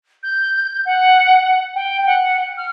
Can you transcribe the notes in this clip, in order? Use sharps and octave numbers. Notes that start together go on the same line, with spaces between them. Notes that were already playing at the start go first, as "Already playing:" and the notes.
G6
F#5
G5
F#5
F6